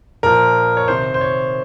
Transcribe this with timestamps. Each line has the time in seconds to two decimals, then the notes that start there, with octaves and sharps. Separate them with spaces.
0.23 A#2 F3 A#4
0.77 C#5
0.88 C3 D#3 C5
1.14 C5
1.21 C#5